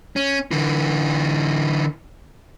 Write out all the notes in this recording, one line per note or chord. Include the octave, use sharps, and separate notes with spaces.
C#4
D3 E3